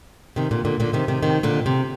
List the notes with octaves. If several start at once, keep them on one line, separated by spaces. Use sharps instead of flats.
C3 D#3
A#2 D3
A#2 D3
A#2 D3
C3 D#3
C3 D#3
C3 D#3
A#2 D3
C3